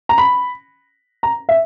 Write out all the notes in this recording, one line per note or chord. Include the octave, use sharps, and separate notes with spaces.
A#5
B5
A#5
E5